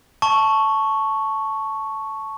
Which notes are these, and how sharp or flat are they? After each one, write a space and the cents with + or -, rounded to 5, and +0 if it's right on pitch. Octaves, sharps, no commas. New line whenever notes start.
A5 +0 C#6 +0